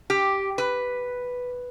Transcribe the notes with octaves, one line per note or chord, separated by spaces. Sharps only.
G4
B4